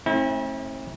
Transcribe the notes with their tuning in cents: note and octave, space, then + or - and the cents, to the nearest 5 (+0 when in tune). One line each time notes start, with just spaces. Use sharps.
A3 +0 C4 +40 E4 -45